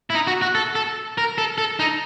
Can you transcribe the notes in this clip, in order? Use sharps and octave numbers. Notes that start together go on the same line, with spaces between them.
E4
D#4
F#4
F#4
A4
A4
A#4
A4
A4
D#4